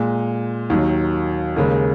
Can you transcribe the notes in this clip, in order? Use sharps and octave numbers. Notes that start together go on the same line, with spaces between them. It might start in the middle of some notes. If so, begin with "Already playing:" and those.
Already playing: A#2 G#3
D#2 D#3 F#3
D#2 C#3 G#3 A#4